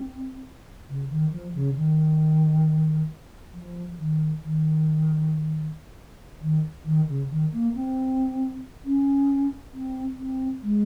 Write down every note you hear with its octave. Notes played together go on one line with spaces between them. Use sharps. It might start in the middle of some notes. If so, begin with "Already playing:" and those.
Already playing: C4
C#3
D#3
F3
C#3
D#3
F3
D#3
D#3
D#3
D#3
C#3
D#3
A#3
C4
C#4
C4
C4
G#3